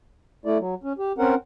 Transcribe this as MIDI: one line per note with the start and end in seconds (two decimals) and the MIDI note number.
0.45 0.58 57
0.45 0.58 64
0.45 0.58 74
0.59 0.75 54
0.83 0.93 61
0.99 1.12 67
1.18 1.35 60
1.18 1.35 61
1.18 1.35 70
1.18 1.35 78